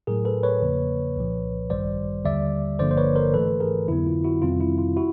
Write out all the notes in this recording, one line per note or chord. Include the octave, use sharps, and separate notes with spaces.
A2 F#3 A3 G#4 A#4
A4 B4
B4 C#5
E2 C#3 F3 A#3
C2 A#2 F3
A1 G2 D#3 G3 C5 D5
D#2 D3 G3 D5 E5
G1 G2 D3 F3 A#3 C5 D5
C5
B4 C#5
A#4 C5
G#2 E3 A3 A4 B4
G#4 A#4
F2 D3 F#3 B3 E4
F4
E4 F#4
F2 C3 D#3 G3 C4 F4
E4
F4
E4 F#4